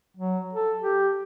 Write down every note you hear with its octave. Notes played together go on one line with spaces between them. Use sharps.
F#3
A4
G4